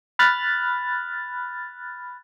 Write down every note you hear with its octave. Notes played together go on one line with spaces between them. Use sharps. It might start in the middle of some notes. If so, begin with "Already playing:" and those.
B5 F6 F#6 A6